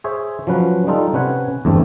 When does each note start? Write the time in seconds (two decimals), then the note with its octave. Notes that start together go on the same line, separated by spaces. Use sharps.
0.04 G#4 C5 C#5 E5
0.47 F3 F#3 C#4 B4
0.87 G3 D#4 F4 A4
1.13 C3 C#4 B4 F#5 G#5
1.65 E2 G2 A3 C4 C#4 A4